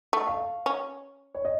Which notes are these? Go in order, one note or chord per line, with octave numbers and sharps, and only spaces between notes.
A3
F5
C#4
C#5
D#5